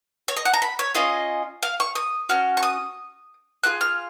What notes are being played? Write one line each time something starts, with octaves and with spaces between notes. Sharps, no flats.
C#5
D#5
F#5
A#5
B5
C#5
C#4 F4 G#4 D#5
F5
C#6
D#6
C#4 F#4 F6
C#6
D#6
A#3 F4 G#4 F#6
F6